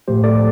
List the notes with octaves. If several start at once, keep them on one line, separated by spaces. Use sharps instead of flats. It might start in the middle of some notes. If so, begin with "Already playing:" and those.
A2 F3 A3 G4 C5
A4 D5